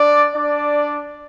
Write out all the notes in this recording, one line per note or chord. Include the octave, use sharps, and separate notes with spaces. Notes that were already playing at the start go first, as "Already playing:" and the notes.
Already playing: D4 D5
D4 D5